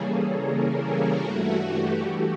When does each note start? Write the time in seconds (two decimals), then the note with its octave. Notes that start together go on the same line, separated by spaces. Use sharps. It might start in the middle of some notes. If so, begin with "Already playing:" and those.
Already playing: C#3 E3 G3 A#3 C#4 G#4 A4
0.30 A#4
0.75 G#4
1.18 G2 E3 A3 F#4
1.62 G4